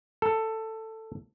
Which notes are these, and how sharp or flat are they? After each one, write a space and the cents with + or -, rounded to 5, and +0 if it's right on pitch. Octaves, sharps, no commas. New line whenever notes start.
A4 +10